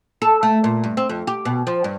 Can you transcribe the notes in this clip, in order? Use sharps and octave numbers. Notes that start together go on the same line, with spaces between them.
A4
A3
A#2
G2
C4
F2
G4
B2
F3
G2